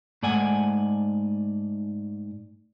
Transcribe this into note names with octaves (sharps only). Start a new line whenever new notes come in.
G#2 A3 D5 F#5 G#5